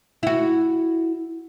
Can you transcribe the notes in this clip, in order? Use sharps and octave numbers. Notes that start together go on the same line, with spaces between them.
E4 F#4